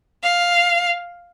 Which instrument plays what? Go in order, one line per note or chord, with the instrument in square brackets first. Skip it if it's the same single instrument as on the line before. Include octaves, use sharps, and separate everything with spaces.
[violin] F5